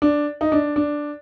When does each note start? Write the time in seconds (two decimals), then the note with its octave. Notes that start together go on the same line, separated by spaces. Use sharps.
0.02 D4
0.41 D#4
0.52 D4
0.76 D4